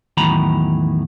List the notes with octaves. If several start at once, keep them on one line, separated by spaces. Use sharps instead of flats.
E2 A2 D#3 F#3 A#5 B5